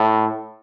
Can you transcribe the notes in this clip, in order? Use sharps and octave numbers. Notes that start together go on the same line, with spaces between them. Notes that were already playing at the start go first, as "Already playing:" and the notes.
Already playing: A2